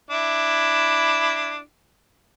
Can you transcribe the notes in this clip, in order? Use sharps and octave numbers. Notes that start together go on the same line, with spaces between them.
D4 E4